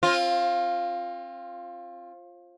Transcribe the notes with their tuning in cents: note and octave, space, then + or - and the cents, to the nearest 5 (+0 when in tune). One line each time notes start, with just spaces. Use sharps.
C4 +35 F4 +0